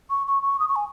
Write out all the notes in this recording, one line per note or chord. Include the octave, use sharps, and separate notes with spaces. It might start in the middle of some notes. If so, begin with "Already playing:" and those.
C#6
C#6
C#6
D#6
C#6
G#5